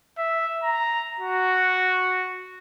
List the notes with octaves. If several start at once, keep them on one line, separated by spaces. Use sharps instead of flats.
E5
A#5
F#4